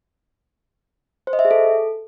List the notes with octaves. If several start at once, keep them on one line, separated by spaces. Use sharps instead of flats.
C5
D#5
E5
G#4
A4